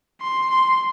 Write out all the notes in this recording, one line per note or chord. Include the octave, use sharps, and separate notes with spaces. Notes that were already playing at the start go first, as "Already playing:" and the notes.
C6
C6